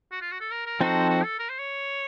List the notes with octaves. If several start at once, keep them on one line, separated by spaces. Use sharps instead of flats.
F#4
F4
F#4
A4
A#4
A#4
F3 C4 D#4 F#4 A4 C5
F#4
A4
A#4
C5
C#5